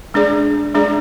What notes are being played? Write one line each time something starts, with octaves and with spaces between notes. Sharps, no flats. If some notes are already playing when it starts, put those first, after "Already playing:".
G#3 D4 G#4 D5
G#3 D4 G#4 D5